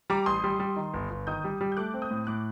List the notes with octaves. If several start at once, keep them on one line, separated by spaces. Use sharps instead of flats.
G3 A#5 D6
A1 C6 D#6
G3
G3
D#3
G1
G1
D#3 D#6 G6
G3
G3
G6
A3 D6 F#6
C4
D#6 G6
A2
A2 D6 F#6